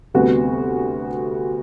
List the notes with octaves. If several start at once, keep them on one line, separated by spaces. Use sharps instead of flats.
D2 C3 G3 B3 F#4